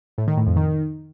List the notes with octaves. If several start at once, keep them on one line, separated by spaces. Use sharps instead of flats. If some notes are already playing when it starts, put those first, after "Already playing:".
A2
D#3
A2
F2
D#3